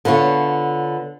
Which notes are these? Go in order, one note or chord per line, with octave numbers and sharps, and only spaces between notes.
D3 B3 F4 C#5